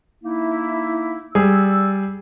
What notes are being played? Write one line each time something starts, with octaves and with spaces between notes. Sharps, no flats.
A#3 D#4 E4
G3 G#4 D5 E6